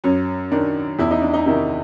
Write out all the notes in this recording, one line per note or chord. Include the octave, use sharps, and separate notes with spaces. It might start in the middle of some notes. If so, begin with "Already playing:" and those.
F#2 C#4
D#3 D4
E2 E4
D#4
D4
D#4
C3 D#3 E4